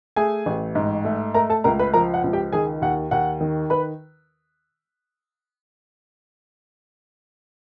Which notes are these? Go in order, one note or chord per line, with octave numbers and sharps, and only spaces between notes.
A3 G#4 G#5
A1
G#2
A3
A3 A#4 A#5
A4 A5
C#2 A#4 A#5
B4 B5
F3 A#4 A#5
F#5
C#2
G4 G5
D#3 G#4 G#5
D#2 F#5
D#2 F#5
D#3
B4 B5